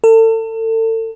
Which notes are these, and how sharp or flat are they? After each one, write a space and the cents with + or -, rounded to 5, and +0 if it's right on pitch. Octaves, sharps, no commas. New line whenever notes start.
A4 +35